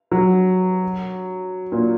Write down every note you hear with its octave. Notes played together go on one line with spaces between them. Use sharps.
F#3
A#2